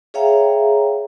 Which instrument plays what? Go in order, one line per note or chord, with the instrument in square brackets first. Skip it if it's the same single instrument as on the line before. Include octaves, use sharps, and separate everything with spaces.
[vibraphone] G#4 C#5 E5 F5 G5 A#5